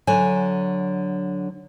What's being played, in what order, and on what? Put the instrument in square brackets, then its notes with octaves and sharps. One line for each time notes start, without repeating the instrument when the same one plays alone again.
[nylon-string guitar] D3 F#3 G#5